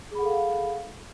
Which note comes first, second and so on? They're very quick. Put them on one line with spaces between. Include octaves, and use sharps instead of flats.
G#4 B5 F#5 A4 F5